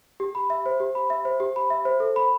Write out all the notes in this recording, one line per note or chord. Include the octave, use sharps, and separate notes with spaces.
G4
B5
E5
C5
G4
B5
E5
C5
G4
B5
E5
C5
A4
B5